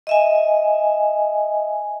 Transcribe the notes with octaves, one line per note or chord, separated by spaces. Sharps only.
D#5 E5 G#5